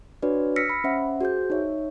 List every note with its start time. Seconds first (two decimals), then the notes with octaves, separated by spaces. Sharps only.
0.23 D4 F#4 B4 C#5 D5
0.56 E6 F6 A#6 B6 C#7
0.70 B5
0.84 C#4 C5 E5 F#5
1.21 F#4 G#4 C5 G6
1.50 D#4 C#5 E5